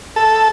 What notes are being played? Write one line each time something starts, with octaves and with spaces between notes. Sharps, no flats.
A4